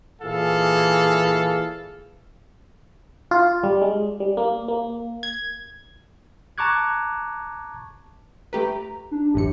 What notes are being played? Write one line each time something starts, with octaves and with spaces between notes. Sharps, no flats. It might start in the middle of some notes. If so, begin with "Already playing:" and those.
A#2 E3 G#4 A4 F5
F4
G3
G#3
G3
A#3
A#3
G#6
A5 A#5 C#6 D6 F#6 G#6
A3 G4 B4 A#5
D4
A1 F#2 G4 C#7